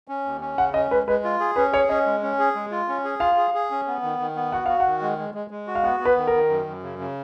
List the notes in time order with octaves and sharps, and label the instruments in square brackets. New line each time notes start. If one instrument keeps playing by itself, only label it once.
[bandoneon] C#4
D#2
C#4
[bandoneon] C#3 [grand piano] F#5
[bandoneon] C#4 [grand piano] D#5
[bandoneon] G#3 [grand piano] B4
[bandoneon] G#3 [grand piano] B4
[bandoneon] F4
G#4
[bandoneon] C#4 [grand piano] B4
[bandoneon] G#4 [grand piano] C#5
[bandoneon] C#4 [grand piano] D#5
[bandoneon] G#3
C#4
G#4
G#3
F4
C#4
G#4
[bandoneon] F4 [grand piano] F5
[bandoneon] G#4
G#4
C#4
B3
D#3
D#3
B3
[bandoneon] F#4 [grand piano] F#5
[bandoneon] F#4 [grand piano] F5
[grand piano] F#5
[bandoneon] D#3
G#3
G#3
G#3
G#3
F#4
[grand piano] F5
[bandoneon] B3 [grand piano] F#5
[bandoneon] B3
[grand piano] B4
[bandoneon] D#3
[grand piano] A#4
[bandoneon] D#3
F#2
F#2
C#3
C#3